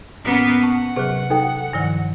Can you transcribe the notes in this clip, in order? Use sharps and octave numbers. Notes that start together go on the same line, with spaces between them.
A2 A#3 B3 C#4
F#5 A5 C#6
C3 F#3 G#4 B4
D#4 A4 G5
G2 D#3 F3